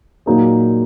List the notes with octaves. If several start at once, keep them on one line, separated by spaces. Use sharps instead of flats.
A#2 F#3 A#3 D#4 G#4